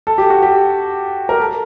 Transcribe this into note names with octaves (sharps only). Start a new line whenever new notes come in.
A4
G4
F#4
G4
A#4
A4